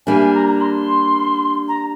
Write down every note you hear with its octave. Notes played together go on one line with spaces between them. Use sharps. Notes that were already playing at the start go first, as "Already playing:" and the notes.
G3 A#3 D4 G#5
G#5
A#5
A#5
C6
A#5